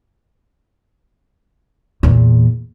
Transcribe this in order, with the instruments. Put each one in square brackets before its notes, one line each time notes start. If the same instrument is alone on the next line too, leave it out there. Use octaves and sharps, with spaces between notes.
[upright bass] E2 A#2